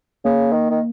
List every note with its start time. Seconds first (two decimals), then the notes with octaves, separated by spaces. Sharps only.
0.25 C#3 A#3
0.52 D#3
0.70 D#3